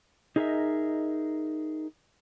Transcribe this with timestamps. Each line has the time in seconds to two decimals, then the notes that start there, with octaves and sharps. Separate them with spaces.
0.36 D#4 G#4 A#4 B4 D#5 E5